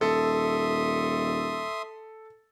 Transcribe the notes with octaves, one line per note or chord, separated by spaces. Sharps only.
D#1 A4 E5 C6 D#6